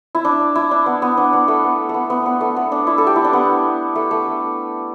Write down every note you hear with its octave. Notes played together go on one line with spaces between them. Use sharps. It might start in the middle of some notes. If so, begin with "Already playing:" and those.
E4
D4
E4
D4
B3
B3
D4
B3
A3
B3
A3
B3
B3
B3
A3
B3
D4
E4
A4
G4
E4
D4
B3
A3
A3